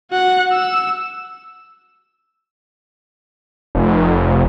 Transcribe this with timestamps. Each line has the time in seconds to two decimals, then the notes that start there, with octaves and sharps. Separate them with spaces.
0.11 F#4 F#5
0.53 E6
3.75 F1